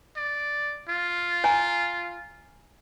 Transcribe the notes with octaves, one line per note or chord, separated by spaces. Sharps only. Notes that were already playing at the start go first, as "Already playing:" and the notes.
D5
F4
C#5 G#5 A#5